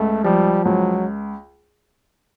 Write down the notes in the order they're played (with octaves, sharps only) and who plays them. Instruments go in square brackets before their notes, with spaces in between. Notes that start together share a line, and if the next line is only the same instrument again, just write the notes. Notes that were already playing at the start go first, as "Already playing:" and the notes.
Already playing: [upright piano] C#2 [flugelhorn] A3
[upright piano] F3 [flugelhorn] G3
[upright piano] C#2 [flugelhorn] F#3